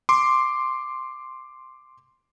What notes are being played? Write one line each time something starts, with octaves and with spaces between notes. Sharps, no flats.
C6 D6